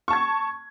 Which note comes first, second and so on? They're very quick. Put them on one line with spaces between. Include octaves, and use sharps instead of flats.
C#6 A5 G#6